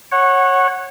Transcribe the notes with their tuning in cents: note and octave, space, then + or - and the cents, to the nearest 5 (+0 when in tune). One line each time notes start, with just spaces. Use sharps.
C#5 -20 F#5 +0